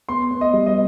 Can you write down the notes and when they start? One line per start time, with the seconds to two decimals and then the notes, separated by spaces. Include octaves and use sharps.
0.09 B3 C6
0.31 B3
0.41 D#5
0.53 G3
0.66 D#5